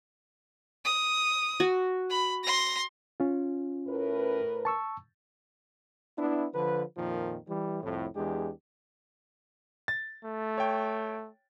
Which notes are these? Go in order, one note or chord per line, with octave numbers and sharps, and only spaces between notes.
D#6
F#4
B5
C6 A#6
C#4 F4
A2 A#4 B4
A5 C#6 E6
B3 D4 E4
D3 F3 B4
F2 A#2 D#3 F3
E3 G3
C2 F2 A2
E2 G#3 D4 G4
A6
A3
C#5 G5